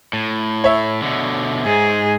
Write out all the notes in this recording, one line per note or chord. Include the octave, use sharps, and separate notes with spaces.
A2
C#5 E5
B2 D3
G#2 G#4